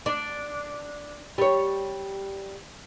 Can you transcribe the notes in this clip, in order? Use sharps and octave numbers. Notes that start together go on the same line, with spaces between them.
D4
G3 C#5